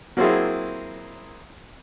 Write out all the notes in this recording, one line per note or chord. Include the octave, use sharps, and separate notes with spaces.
F#3 A#3 C4 E4 F4 G#4